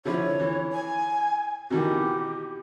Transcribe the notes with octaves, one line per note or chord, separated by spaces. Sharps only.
D3 F3 E4 C#5
E3
G#5
B2 D#3 E3 G4